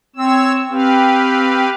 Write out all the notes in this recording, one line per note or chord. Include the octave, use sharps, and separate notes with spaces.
C4 C#5 E6
C4 G4 B4 F5